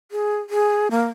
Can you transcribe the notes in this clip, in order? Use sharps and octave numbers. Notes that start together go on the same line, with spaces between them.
G#4
G#4
A#3